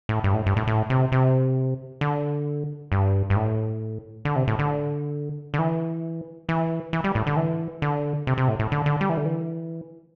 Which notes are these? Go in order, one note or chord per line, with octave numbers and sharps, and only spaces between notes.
A2
G2
A2
G2
A2
A2
C3
C3
D3
G2
G2
A2
D3
C3
A2
D3
D3
E3
E3
E3
G3
A2
D3
E3
D3
C3
C3
A2
A2
D3
D3
G3
E3
D3
E3